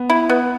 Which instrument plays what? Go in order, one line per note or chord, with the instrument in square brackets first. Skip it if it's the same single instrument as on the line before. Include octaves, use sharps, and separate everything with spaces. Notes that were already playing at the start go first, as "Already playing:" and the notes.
Already playing: [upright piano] B3
[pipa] E4
B3